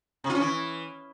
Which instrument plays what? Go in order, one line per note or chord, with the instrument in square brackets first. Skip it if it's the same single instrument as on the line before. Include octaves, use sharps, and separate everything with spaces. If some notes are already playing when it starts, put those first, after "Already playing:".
[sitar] C3
F4
C#4
E3